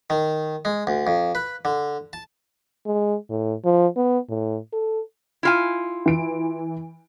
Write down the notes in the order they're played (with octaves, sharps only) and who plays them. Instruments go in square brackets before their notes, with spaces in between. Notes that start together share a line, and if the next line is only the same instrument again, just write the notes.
[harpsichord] D#3
G#3
D2
F2
B4
D3
A5
[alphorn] G#3
A2
F3
B3
A2
A4
[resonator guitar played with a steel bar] E4 F4 G#5
[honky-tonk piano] E3 D7